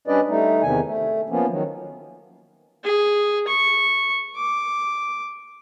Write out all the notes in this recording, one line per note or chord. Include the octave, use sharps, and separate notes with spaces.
G3 C#4 D4 B4 D5 D#5
G3 A3 D#4
E2 C3 D#3 G#5
A3
F3 A#3 B3 C#4
D#3 F#3
G#4
C#6
D6